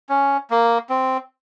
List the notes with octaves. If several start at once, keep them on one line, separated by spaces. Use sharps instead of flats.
C#4
A#3
C4